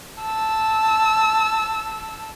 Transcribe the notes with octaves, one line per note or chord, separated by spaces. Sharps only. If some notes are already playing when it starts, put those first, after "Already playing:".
A5 E6